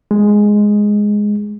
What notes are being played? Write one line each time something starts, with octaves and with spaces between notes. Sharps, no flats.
G#3